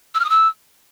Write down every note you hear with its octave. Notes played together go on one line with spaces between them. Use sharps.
E6
F6
D#6
E6